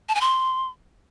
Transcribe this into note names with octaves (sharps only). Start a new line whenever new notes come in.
A5
G#5
C6